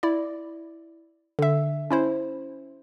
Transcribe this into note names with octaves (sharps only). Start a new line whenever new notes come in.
E4 D5
D3 E5
C#4 E4 C5